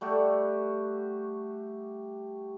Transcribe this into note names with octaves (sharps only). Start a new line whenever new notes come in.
G3 A3 F#4 G4